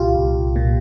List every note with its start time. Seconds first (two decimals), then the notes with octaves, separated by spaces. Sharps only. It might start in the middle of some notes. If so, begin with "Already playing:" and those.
Already playing: C2 A#2 F4 G4
0.15 C2
0.56 A#2